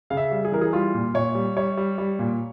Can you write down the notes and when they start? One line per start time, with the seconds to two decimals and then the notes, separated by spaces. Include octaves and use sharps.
0.10 C#3 F5
0.17 E5
0.31 G3
0.45 G#4
0.52 E3 A#4
0.61 G#4
0.73 G3 F4
0.94 A#2
1.14 A#2 C#5
1.35 G3
1.56 G3 C#5
1.77 G3
1.98 G3
2.19 A#2